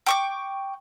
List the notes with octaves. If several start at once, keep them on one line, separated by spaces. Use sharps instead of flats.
G5 C#6 D6